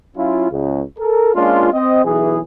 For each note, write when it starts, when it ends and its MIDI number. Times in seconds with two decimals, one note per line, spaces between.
0.16 0.49 54
0.16 0.49 61
0.16 0.49 64
0.16 0.49 65
0.50 0.81 37
0.98 1.33 69
0.98 1.33 70
1.34 1.68 56
1.34 1.68 58
1.34 1.68 61
1.34 1.68 62
1.34 1.68 65
1.72 2.04 60
1.72 2.04 75
2.04 2.39 35
2.04 2.39 52
2.04 2.39 68